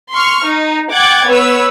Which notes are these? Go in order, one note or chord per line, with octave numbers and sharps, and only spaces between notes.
C6 C#6 F6
D#4
F#5 G5 D6 F#6 G#6 A6
B3 B4 C#5 E6